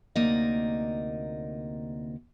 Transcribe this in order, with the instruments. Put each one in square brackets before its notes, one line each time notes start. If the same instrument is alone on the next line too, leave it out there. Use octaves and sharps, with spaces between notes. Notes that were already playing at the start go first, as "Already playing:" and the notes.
[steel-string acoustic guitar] D2 C3 A#3 D#4 D5 D#5